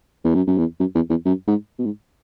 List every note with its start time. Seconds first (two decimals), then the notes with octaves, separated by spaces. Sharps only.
0.24 E2
0.35 F#2
0.47 F#2
0.58 E2
0.80 F#2
0.95 E2
1.10 E2
1.25 F#2
1.47 G#2
1.78 B2
1.85 G#2